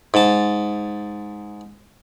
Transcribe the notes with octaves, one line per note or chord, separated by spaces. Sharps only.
G#2 A5